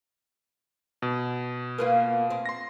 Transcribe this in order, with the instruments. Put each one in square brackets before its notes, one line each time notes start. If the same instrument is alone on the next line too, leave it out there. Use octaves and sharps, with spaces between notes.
[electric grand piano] B2
[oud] A#3 B3 F4
C4
[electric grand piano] C6 A#6